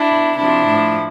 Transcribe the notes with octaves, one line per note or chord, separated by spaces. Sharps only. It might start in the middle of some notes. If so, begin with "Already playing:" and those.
Already playing: D4 E4
B2
C3 F3 D4 E4
A2 F3